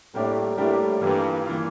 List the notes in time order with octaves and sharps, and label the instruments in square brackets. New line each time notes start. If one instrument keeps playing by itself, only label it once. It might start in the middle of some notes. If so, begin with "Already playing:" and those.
[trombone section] A2 [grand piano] G3 A#3 D4 G4 A#4
[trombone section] A2 [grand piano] G3 A#3 D4 G4 A#4
[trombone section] G2 [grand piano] E3 A#3 F4
[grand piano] E3 A#3 F4